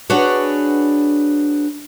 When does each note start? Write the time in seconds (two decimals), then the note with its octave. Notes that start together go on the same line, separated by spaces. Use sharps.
0.10 D4 F#4 G#4 B4 C#5